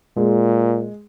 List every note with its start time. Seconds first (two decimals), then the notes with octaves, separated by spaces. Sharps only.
0.16 A#2 G#3